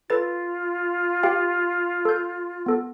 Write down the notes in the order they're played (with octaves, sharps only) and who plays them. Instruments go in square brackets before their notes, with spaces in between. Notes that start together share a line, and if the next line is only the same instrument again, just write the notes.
[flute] F4 [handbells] A4 B4 A6
[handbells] G4 F5 G5
A4 G6
B3 A4